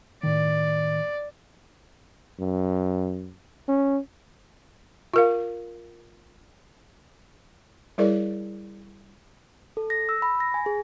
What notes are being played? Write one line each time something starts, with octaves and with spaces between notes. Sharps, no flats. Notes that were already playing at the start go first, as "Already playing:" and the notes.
A2 D#3 D5
F#2
C#4
F4 A#4 F5
G3 E4 G#4 A#4 C#5 D5
A4
A#6
E6
B5
A#6
G#5
G#4